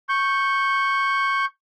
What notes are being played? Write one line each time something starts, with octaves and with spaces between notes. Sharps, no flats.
C#6 G6